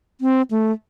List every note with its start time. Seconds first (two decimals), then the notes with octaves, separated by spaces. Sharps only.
0.21 C4
0.51 A3